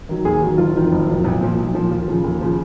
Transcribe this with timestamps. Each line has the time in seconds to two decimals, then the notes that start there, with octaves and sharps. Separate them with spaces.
0.09 D#3 F#3
0.25 D#2 G#4
0.42 D#3 F#3 F#4
0.58 F#1 F4
0.75 F2 D#3 F#3
0.92 F#1
1.08 F2 D#3 F#3
1.24 B1
1.41 A#2 F3
1.58 B1
1.74 A#2 F3
1.91 D#2 F4
2.08 C#3 F3
2.24 D#2
2.41 C#3 F3